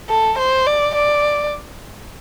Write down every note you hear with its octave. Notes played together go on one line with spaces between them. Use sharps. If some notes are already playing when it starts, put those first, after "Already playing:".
A4
C5
D5
D5